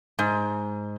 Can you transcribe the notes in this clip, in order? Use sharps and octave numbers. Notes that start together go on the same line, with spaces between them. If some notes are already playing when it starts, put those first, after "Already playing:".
G#2